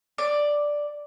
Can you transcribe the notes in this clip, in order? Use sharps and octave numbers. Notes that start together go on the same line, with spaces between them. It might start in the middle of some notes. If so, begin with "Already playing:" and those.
D5